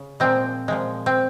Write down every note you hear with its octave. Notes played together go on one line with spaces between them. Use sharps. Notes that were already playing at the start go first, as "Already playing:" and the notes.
Already playing: C#3
A#2 F3 G#3 C4
A#2 F3 G#3
C4